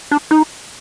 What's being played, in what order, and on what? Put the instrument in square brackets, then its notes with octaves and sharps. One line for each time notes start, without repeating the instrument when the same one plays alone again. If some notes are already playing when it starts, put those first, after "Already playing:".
[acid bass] D4
D#4